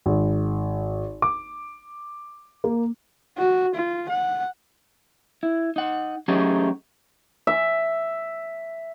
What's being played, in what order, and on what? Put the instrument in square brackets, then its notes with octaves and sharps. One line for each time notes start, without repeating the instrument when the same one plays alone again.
[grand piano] G#1
D6
A#3
[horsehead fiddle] F#4
F4
F#5
[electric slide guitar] E4
D#4 F#5
F#3 A3 C#4 D#4 G4 G#4
[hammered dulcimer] E5